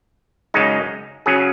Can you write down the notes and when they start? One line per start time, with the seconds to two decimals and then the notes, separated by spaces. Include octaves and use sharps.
0.54 F#2 C#3 G#3 D#4
1.26 C#3 F#3 C#4 G#4